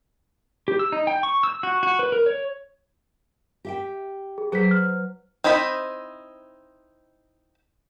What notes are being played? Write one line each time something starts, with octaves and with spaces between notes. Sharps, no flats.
G4
E6
D#4
G5
C#6
E6
F#4
F#4
B4
A#4
C#5
G4 E5 G5
G#4
F#3 G#4 B4 C5 B6
F6
C4 D#4 E4 D#5 B5